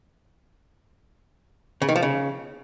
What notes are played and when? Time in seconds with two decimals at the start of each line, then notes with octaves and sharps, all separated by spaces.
1.82 C#3
1.89 D#3
1.96 F3
2.03 C#3